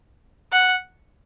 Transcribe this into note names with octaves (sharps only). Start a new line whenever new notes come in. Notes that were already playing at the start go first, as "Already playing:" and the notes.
F#5